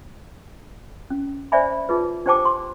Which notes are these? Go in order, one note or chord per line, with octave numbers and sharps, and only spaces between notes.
C#4
C5 D5 E5 G#5 B5
D#4 F4 G#4 B4
D4 G4 C5 G5 A5 D6
C6